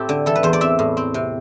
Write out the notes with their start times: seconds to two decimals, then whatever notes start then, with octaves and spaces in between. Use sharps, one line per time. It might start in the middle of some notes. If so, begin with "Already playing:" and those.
Already playing: A2 C4 G4 A4
0.09 D3
0.26 E3 A4
0.35 B4
0.43 E2 C5
0.53 D5
0.61 C4 E5
0.79 A2
0.97 C4
1.14 C3